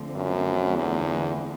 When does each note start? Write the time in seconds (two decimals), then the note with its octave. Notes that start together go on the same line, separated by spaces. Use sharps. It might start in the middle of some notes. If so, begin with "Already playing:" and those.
Already playing: D3 F3 A3 C4
0.15 F#2
0.76 E2